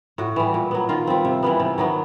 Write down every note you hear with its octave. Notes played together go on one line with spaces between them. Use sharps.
A2 F#4
E3 G3
A#2
F#3 B3
D#3 F4
G3 C4
C3
E3 G3 B3
C3
D#3 F#3 B3